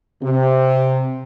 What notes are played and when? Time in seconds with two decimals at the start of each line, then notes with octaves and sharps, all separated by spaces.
0.23 C3